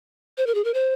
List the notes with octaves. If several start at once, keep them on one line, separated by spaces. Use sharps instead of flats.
C5
A#4
G#4
A#4
C5